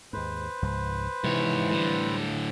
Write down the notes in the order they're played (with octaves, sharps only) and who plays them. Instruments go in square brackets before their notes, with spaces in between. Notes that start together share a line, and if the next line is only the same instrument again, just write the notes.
[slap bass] D#2 G#2 [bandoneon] B4 C5
[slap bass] C#2 G#2 F3
[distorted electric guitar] G#2 C#5 [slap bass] C3 [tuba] E3
[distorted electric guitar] A2 D3 [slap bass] G3